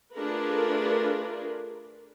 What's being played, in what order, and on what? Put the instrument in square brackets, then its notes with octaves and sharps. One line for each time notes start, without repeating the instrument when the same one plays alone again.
[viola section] A3 D4 F4 G#4 A#4 B4